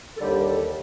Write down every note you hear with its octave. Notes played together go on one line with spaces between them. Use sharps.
A4
D#2 D3 G3 G4
A#4
A4